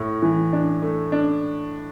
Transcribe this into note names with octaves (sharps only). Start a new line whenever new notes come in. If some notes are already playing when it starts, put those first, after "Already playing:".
Already playing: A2
E3
D4
A3
D4